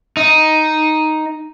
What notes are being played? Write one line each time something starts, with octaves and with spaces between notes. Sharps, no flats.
D#4